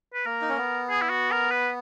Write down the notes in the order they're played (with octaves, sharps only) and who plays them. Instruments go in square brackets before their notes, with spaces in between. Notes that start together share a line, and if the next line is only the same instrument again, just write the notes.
[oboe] B4
[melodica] A#3 [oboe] A#4
[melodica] D#4
C#4
B3
[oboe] G#4
E4
F#4
A#4
B4